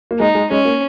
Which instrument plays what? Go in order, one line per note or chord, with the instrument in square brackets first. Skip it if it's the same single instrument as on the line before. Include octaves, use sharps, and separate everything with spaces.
[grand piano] A#3
[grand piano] G#3 [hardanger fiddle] D#4
[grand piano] G#3
[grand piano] G#3 [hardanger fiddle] C#4
[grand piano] A#3